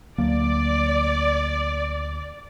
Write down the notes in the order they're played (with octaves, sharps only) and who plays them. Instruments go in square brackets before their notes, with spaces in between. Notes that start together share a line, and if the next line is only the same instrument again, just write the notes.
[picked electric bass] D2 F#3 A#3 [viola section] D5